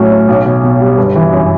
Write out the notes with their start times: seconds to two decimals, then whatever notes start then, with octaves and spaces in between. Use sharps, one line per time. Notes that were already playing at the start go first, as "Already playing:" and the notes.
Already playing: A2 F#3 C#4
0.11 C#4
0.28 B1
0.46 B2
0.64 B2
0.81 G3
0.98 G1
1.16 E3
1.32 F#2